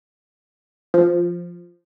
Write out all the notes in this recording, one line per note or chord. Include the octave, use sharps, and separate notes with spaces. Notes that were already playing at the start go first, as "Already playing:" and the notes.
F3